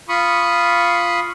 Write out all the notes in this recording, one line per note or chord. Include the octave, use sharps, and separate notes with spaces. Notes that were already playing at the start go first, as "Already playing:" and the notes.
F4 B5 C#6 D#6